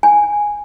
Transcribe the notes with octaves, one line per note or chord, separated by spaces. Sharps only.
G#5